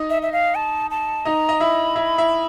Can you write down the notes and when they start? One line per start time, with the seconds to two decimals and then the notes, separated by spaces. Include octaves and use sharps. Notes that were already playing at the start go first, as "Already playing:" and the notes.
Already playing: D#4 D#5
0.10 E5
0.22 E5
0.33 F5
0.55 A5
0.91 A5
1.25 D#4 D#5 A#5
1.49 D#5
1.60 E4 E5 B5
1.96 E4 E5
2.18 E4 E5